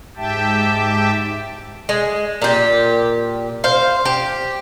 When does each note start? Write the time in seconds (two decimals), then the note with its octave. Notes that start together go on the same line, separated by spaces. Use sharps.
0.16 G#2 G4 E5 G5 A5
1.89 G#3
2.42 A#2 G4
3.64 C5 F5
4.05 G4